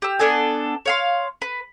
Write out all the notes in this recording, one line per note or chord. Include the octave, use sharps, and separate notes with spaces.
G4 E6
B3 D4 A4 G#5
C#5 F5 C6
B4